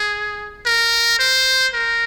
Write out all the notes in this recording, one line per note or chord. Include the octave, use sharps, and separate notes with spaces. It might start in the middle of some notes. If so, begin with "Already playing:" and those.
Already playing: G#4
A#4
C5
A#4